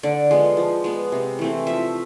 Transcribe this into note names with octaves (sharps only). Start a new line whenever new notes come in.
D3 D5
F3 G#3 B3
F3
G#3 B3
C3
E3 A3 C4
F3 E5